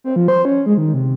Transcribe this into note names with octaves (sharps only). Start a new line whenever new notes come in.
C4
F3
C5
C#4
G#3
D#3
C3